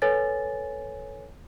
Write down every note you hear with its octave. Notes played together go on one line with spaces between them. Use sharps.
A4 B4 C#5 G#5 A6